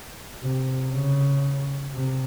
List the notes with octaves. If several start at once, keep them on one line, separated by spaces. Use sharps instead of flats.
C3
C#3
C3